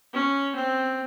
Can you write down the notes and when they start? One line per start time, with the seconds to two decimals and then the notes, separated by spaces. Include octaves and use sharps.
0.13 C#4
0.55 C4